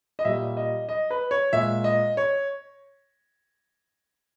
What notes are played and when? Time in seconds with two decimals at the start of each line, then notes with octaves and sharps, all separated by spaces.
0.19 D#5
0.25 A#2 G3 E5
0.57 D#5
0.89 D#5
1.10 B4
1.31 C#5
1.53 A#2 G#3 E5
1.84 D#5
2.17 C#5